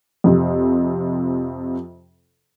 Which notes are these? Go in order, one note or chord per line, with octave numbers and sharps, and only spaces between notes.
F2 C3